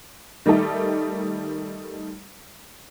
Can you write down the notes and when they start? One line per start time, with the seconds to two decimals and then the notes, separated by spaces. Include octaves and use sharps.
0.46 D#3 G3 A3 D#4 A4